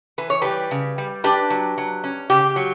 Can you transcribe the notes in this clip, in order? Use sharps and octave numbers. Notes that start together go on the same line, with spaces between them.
E3 B4
C#5
G3 G4 B4
C#3
G3
D4 G4 B4
F#3
F#3
C#4
C#3 G4
F#3